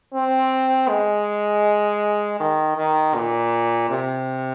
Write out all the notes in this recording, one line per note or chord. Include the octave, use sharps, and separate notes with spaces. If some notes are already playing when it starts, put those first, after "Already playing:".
C4
G#3
D#3
D#3
A#2
C3